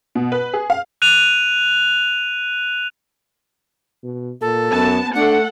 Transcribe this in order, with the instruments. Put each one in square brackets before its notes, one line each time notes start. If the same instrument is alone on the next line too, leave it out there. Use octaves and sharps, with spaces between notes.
[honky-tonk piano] B2
B4
G#4
F5
[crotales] F#6 D#7 F7
[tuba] B2
[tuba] A#2 [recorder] A4
[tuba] F#2 [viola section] B3 A5
[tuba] A3 [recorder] D4 [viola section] A4 F#5